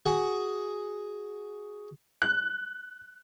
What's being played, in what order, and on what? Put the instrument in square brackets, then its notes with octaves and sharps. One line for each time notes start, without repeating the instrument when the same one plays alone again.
[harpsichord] F#4 G#4 F#5 G#5
[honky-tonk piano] F#6